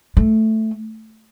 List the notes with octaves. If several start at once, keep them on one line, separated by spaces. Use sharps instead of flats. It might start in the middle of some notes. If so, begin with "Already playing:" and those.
A3